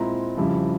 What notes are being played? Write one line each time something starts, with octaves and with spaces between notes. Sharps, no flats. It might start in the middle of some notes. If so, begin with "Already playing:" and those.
Already playing: A#2 G#3 C4 E4 A#5
F2 C#3 G3 C#4 E4